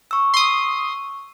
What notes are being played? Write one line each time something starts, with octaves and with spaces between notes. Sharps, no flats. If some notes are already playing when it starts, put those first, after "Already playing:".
C#6 E6
C6 D#6